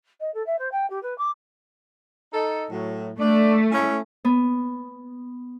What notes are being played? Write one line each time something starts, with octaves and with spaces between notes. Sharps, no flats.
D#5
A4
E5
C5
G5
G4
B4
D6
D#4 A4
A2 F#3
A3 D4 D5
C#4 E4
B3